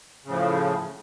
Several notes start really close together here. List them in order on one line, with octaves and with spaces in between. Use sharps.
C#3 A2 F3